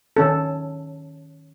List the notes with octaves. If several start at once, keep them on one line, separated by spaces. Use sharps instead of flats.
D#3 C#4 A4